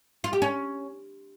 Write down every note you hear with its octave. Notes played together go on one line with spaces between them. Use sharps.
F4
G4
C#4